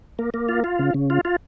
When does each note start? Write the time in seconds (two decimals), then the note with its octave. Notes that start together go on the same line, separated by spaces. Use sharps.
0.19 A#3
0.34 A#3
0.49 F4
0.64 F4
0.79 C#3
0.94 C#3
1.10 F4
1.25 F4